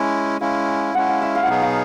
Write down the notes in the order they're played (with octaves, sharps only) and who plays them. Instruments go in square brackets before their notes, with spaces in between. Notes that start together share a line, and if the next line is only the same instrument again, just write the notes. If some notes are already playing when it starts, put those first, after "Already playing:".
Already playing: [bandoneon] G#3 C#4 E4 [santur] D#5
[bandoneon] G#3 C#4 E4 [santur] F5
[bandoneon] G#3 C#4 E4 [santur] F#5
[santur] F5
E5
F5
F#5
[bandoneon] B2 F#3 B3 D#4 G#4 [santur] F5
[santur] F5